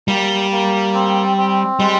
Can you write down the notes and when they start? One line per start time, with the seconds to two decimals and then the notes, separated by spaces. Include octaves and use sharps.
0.08 G3 A#3
0.51 A#3
0.94 C4
1.37 C4
1.79 G3 G#3